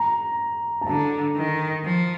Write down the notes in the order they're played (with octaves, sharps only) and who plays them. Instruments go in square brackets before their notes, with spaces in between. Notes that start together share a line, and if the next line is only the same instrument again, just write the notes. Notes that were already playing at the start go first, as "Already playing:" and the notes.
Already playing: [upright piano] A#5
A5
[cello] D3 [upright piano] A#5
[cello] D#3
F3